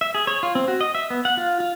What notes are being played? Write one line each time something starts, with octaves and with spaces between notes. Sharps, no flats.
E5
G#4
C#5
F4
C4
F#4
D#5
E5
B3
F#5
F4
F4